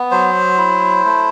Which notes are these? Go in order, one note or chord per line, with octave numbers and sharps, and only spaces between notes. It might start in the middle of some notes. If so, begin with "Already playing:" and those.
Already playing: B3
F#3 C5
E4
A3